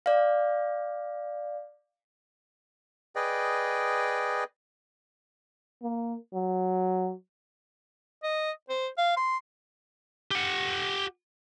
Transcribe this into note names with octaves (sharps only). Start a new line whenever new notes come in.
D5 F5
G#4 B4 D5 D#5 G5
A#3
F#3
D#5
C5
F5
C6
G4 F#5